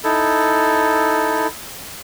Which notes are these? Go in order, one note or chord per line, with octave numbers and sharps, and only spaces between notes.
D#4 E4 A4